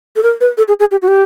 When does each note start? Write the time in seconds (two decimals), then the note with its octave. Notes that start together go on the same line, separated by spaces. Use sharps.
0.16 A4
0.23 A#4
0.41 B4
0.57 A4
0.68 G#4
0.80 G#4
0.91 G4
1.02 F#4
1.08 G4